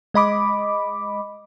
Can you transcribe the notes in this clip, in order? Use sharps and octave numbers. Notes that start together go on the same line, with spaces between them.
G#3 D#5 B5 D6